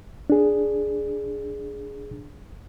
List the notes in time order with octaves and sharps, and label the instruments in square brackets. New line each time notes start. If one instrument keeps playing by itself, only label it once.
[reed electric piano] D4 G#4